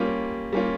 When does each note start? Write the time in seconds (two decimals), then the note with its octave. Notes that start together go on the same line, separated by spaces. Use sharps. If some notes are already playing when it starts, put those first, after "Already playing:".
Already playing: G3 A#3 C#4 F4
0.53 G3 A#3 C#4 F4